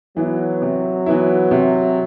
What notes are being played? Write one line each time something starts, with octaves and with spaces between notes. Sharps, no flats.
E3 F#3 B3 E4
C3
E3 B3 E4
C3